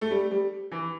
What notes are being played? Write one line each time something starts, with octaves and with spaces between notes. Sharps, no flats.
A3
G3
G3
E3